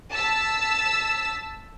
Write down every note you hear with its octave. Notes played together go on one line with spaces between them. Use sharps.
A5 E6 B6